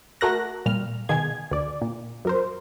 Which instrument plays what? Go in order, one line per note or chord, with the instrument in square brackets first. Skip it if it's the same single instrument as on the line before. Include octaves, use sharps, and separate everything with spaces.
[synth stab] A3 F#4 A#4 F#6 A#6
A#2 G3 F6
B2 D#3 G#4 G#6
D2 D5
A#2
F#2 A#4 C5